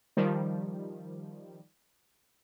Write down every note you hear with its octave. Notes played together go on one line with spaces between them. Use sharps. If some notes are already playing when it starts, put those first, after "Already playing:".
D#3 F3 G3